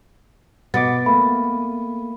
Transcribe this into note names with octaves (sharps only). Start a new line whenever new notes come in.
B2 B3 D#5 D6 A6
A3 A#3 B5